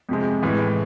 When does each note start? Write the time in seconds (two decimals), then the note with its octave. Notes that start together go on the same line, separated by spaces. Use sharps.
0.09 F2 C3 G#3
0.43 A2 E3 G#3